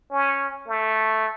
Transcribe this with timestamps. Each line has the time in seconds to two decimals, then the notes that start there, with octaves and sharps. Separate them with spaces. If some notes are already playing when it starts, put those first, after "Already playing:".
0.11 C#4
0.68 A3